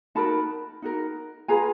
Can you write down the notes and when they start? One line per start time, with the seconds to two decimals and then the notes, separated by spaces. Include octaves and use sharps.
0.15 D#4 F#4 A#4 A5 B5
0.82 D#4 F#4 A#4
1.48 F4 G#4 B4 G#5 A#5